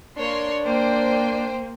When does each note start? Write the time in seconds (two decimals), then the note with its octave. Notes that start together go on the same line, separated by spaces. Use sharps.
0.17 A#3 D4 C#5 C6
0.65 A#3 C5 G5